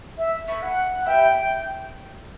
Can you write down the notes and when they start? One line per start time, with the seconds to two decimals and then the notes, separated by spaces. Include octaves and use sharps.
0.18 E5
0.47 A3 C#4 E4 B4 E5
0.62 F#5
1.06 E4 G4 B4 E5 G5